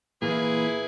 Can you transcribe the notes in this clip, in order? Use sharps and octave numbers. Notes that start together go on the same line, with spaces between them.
A#2 E3 A#3 E4 G#4 B4